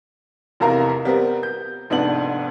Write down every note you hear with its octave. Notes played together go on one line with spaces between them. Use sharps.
F1 E2 C3 A#4 F5 A#5
G3 B3 C4 A#4
G6
F1 G#2 B3 D4 F#7